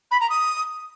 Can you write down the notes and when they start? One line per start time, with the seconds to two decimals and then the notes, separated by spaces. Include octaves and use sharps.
0.11 B5
0.20 A#5
0.29 D#6